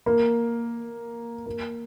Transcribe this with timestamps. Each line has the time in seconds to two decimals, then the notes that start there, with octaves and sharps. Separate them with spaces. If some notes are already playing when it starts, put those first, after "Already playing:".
0.06 A#3
1.46 A#3